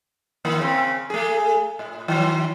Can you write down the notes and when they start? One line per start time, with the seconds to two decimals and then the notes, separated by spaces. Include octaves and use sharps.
0.45 D#3 A#3
0.59 C#3 C4
1.10 A3 G#4
1.79 A2
2.08 D#3 F#3